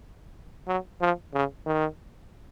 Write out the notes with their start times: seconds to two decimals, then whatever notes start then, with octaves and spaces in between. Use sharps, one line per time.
0.68 F#3
1.01 F3
1.34 C#3
1.66 D#3